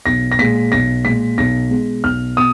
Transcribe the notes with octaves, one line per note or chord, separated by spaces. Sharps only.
B1 A#6
A#6
A#2 G#3 B6
B1 A#6
A#2 G#3 B6
B1 A#6
B2 G#3
B1 F6
B2 D#6